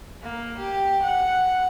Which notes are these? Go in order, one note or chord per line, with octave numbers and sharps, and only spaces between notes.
A#3
G4
F#5